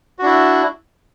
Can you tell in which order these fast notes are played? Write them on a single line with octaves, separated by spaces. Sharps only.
F#4 D4 E4